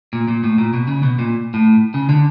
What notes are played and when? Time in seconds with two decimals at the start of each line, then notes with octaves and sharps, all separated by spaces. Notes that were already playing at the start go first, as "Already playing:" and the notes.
0.13 A#2
0.28 A#2
0.44 A2
0.58 A#2
0.73 B2
0.88 C#3
1.03 B2
1.19 A#2
1.54 A2
1.94 C#3
2.09 D3